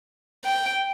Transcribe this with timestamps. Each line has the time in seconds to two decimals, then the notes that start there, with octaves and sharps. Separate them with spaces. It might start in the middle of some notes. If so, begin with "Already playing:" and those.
0.45 G5